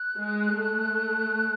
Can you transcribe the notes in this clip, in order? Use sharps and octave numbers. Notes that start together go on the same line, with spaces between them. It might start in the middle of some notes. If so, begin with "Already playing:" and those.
Already playing: F#6
G#3
A3